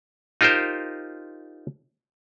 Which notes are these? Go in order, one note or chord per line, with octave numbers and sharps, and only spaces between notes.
D#4 F4 G4 A#4 C5